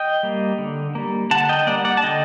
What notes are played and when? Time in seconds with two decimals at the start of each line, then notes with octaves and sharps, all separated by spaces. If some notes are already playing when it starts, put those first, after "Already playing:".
Already playing: D#5 G5
0.23 G3 A#3
0.58 D3
0.95 G3 A#3
1.31 D3 F#5 A5
1.49 D#5 G5
1.67 G3 A#3 D5 F#5
1.85 D5 F#5
1.97 A5
2.03 D3 D#5 G5